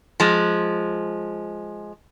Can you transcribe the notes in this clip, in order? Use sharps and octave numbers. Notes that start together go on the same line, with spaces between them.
F3 G#3